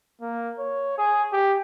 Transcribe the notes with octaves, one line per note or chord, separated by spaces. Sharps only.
A#3
C#5
G#4
G4